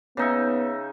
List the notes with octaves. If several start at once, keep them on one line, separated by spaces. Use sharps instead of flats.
C#3 B3 D#4 E5